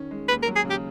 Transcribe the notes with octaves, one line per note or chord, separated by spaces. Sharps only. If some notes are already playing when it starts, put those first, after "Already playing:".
Already playing: D#3 C#4
G#3
D#2 B4
A#4
F#3
G#4
C#3
G4